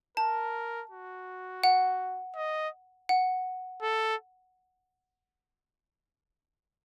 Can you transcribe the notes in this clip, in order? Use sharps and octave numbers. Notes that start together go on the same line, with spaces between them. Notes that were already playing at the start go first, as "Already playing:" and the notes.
A#4 A5
F#4
F#5
D#5
F#5
A4